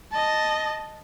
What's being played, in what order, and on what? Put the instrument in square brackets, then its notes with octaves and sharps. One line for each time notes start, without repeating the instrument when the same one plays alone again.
[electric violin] D#5 A5